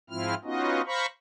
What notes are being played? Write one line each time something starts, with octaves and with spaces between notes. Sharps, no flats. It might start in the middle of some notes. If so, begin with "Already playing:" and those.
G#2 F3 C4 E4 F4 F6
B3 C#4 D#4 F4 F#4 D#5
C5 F5 A#5 B5 C#6